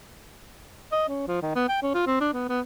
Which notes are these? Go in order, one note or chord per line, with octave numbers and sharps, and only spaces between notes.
D#5
C#4
F3
D#3
B3
G5
C#4
F4
C4
D4
B3
B3